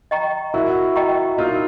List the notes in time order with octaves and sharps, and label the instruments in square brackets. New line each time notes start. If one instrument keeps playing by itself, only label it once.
[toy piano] D#5 G5 A#5 C#6
[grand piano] E4 F#4 [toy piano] A#4
[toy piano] D#5 G5 A#5 C#6
[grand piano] D#4 F4 [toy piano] A#4